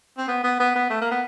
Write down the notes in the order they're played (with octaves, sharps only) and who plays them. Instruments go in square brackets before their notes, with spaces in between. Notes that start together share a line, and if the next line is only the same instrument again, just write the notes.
[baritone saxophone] C4
B3
B3
B3
B3
A3
A#3
B3